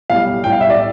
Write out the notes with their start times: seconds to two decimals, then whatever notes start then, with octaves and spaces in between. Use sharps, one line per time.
0.10 B1 A2 G3 F5
0.44 B1 A2 G3 G5
0.52 F5
0.61 E5
0.70 D5